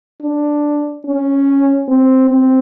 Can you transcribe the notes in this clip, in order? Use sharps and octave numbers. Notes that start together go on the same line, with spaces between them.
D4
C#4
C4
C4